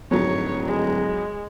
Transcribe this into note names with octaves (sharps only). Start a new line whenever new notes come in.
D1 F2 G#2 F#3 C#5
G#3